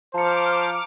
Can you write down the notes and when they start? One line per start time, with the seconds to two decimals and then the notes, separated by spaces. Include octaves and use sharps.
0.14 F3 C5 A5 A#5 D6 F6 C#7